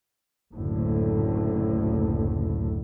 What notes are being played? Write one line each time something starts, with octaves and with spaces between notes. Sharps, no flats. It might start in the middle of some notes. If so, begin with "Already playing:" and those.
F#1 D2 A2